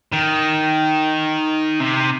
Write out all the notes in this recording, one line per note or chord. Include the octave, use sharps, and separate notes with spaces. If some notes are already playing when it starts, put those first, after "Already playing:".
D#3
C3